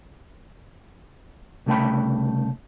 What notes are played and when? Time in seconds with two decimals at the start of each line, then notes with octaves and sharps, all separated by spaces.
1.66 C2 C#3 A3 G4 G5 B5